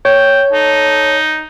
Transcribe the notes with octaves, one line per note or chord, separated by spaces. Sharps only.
C#5 G5
D#4 A4